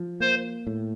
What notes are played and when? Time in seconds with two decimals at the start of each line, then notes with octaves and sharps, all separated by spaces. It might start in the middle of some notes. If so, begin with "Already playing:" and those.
Already playing: F3
0.20 A#3 C5
0.67 A2